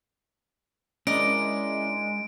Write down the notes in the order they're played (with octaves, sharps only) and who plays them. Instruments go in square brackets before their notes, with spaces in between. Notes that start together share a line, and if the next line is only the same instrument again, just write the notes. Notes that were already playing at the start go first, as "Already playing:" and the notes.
[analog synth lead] G#3 [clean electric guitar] C#4 D4 E4 [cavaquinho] A#4 D5 D#5 [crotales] D7